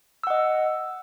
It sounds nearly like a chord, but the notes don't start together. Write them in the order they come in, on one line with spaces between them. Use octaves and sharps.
E6 F#5 D#5